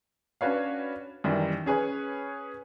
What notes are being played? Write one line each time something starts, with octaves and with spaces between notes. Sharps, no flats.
C#4 D4 F#4 B4 C#5 F5
F#2 D#3 E3 G3
C#4 G#4 B4 C#5